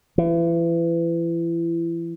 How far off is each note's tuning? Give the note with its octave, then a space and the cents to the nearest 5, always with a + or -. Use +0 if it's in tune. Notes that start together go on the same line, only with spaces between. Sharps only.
E3 +30